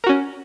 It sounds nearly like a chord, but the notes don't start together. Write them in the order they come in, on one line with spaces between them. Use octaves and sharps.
A#4 F#4 C#4